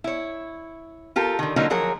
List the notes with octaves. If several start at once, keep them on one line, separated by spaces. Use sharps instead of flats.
E4 C#5
F4 G4 A4 A#4
D3 D#3
D3 F#3 A#3 C#4 D#4 F4
F3 F#3 G#4 A#4 C#5